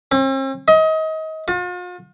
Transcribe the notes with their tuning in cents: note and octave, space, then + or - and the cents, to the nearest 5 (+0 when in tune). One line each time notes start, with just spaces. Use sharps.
C4 +45
D#5 +30
F4 +45